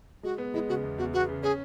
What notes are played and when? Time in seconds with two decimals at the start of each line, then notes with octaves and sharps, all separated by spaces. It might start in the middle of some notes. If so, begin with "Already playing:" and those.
0.23 G#3 F#4
0.38 B3
0.54 G#3 E4
0.68 C#3 F#4
0.83 E2
0.98 E2 F#4
1.14 B3 F#4
1.29 C#3
1.43 C#4 G#4